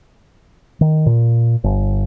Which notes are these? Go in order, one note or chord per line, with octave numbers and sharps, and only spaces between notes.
D#3
A#2
G1